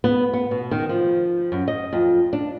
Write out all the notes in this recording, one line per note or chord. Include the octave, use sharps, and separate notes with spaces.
B3
B3
B2
D#3
F3
F#2
D#5
F2
D4